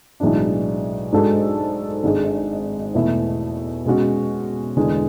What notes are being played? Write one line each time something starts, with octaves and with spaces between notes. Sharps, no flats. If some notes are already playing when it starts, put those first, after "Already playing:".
B1 A2 E3 G#3 D4
G#2 G#3 D4 F#4 A4
G#1 G#2 G#3 D4 G#4
E2 B2 A3 E4
B2 G#3 C#4 F#4
E2 D3 G#3